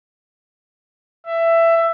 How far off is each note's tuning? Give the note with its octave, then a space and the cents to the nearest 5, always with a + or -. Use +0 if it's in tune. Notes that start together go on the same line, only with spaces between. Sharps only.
E5 +15